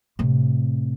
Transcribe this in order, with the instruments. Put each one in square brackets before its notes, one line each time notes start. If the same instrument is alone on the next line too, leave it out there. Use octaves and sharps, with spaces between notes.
[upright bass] A2 C3